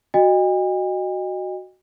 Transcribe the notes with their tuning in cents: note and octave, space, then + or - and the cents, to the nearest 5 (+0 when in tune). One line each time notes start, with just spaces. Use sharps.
F#4 +0 D#5 -15 G5 +45